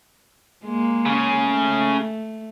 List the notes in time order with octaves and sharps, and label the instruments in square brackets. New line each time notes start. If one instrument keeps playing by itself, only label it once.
[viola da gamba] G#3 A#3
[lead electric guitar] C#3 C#4
[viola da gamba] A3